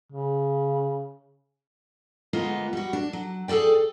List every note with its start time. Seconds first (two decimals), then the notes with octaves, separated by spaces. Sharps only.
0.12 C#3
2.33 D2 G#3 A#3 B3 F4 D#5
2.73 G3 F#4
2.93 D4
3.13 F#3
3.48 G#4 A4 C5 D5 G5